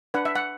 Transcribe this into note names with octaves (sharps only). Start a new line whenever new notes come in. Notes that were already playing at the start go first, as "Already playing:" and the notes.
D4 B4 F#5
E5
F#5